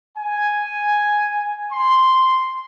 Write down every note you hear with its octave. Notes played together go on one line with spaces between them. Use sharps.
G#5
C6